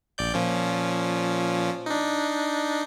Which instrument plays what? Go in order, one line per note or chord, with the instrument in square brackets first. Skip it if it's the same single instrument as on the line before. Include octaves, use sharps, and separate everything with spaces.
[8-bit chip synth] A#1 D5 G6
A#2 F3 C#4
D4 D#4